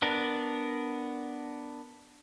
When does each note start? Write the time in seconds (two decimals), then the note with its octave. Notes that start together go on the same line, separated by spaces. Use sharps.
0.02 B3 D4 A#4